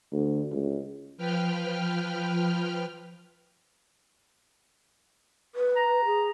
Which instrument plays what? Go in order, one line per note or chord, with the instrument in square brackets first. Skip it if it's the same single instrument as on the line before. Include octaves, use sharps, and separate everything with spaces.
[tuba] D2
C#2
[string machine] F3 B4 G5 F6
[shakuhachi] B4
[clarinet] A#5
[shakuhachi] G#4